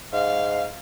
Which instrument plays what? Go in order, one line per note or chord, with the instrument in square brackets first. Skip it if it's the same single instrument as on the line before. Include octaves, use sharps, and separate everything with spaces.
[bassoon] G#2 [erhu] F5